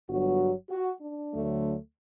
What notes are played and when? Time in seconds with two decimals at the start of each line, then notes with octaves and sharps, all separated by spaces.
0.08 G1 G2 F#3 F#4
0.70 F#4
1.01 D4
1.32 D2 D3 F#3 A3